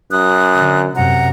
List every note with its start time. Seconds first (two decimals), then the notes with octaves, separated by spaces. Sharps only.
0.11 F#2 D#6 F#6
0.56 D3
0.95 F#2 C3 F#5 A#5